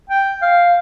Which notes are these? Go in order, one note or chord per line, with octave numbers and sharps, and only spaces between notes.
G5
F5